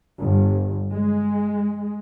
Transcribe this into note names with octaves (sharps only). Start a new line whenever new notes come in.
G1
G#3